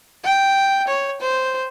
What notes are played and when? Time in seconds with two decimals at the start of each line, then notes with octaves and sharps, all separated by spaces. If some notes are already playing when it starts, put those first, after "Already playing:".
0.24 G5
0.88 C#5
1.21 C5